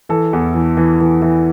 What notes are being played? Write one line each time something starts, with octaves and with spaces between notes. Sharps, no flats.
E3 A4
E2
E3
E3
E3
E3